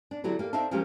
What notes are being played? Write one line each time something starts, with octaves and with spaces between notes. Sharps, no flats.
D4
D3 F#3 E4 G4
A#3 G4
C4 D4 D#4 E5 F5 A5
F3 F#3 G#3 A#3 C#4 G4